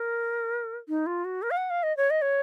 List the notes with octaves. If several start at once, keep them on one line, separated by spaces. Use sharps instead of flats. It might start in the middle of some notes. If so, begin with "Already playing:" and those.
Already playing: A#4
D#4
F4
F#4
A#4
F5
F#5
F5
D#5
C#5
D#5
C#5